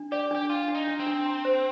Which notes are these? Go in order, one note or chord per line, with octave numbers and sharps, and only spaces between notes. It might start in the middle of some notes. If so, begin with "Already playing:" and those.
Already playing: D4
G4 D5
D4 G4
D4 F4
D4
D#4
D4
C4
D4
A#5
C5